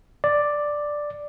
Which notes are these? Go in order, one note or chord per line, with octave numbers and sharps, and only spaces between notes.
D5